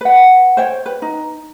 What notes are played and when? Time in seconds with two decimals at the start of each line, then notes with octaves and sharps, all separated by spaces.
0.01 B4 F#5
0.57 C5 C#5 G5
0.86 B4
1.02 D#4